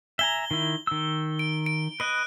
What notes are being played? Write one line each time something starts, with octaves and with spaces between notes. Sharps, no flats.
E5 G#5 A#5 G7
D#3 E4
D#3 E6
D7
D7
B4 D#5 F#6